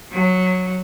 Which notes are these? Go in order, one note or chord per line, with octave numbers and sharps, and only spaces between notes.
F#3